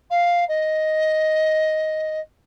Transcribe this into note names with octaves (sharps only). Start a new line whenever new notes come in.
F5
D#5